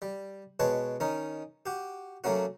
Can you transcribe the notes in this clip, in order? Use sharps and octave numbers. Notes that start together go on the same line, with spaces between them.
G3
B2 G#3 B4 C#5 A5
D#3 C#4 D#4
F#4 G4
F#3 A3 A#3 C#4 F#4